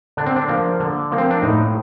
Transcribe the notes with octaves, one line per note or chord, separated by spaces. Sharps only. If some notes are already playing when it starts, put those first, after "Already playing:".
D3 D4
C4
D4
F3 A#3
D3
F3 A#3
C4
D4
A2 D#4